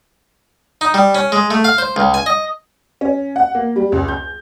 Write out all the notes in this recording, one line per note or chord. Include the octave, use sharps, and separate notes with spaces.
D#4
G3
C#4
G#3
A3
F5
C5
C#2
G#5
D#5
C#4
F#5
A#3
G3
C#2
G6